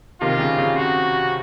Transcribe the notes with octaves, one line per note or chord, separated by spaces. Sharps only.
C3 D#3 F4
C#3
C#3
F#4